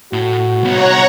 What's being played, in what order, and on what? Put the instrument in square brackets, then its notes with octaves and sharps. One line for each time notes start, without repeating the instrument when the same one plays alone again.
[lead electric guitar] A2 [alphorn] F#4
[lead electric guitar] C2 B3 [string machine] C#5 F#5 A#5